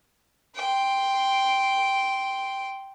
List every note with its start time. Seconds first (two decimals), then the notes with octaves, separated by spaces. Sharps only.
0.56 G5 C6